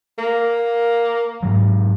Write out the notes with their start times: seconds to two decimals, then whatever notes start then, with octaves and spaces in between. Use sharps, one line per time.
0.18 A#3
1.42 G#2 F#3